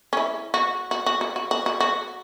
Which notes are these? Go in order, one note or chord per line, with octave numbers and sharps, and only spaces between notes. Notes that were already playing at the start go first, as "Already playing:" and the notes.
C#4
E4
F#4
F#4
F#4
F#4
F#4
F#4
F#4
F#4